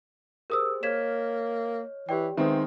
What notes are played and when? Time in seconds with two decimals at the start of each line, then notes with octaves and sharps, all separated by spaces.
0.50 G4 G#4 A#4 C5 D#6 E6
0.83 A#3 C#5 D#5 F6 G#6 B6 E7
2.09 E3 G4 D5 G5
2.37 D#3 G#3 B3 C4 E5 G5 C#6 D#6